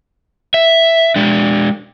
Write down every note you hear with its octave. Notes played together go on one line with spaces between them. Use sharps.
E5
G#3 D4